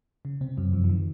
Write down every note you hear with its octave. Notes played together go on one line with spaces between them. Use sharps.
C#3
C3 C4
F#2 F#3
F2 F3
F3
D#3